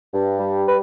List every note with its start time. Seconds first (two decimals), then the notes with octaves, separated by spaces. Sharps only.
0.12 G2
0.40 G3
0.67 B4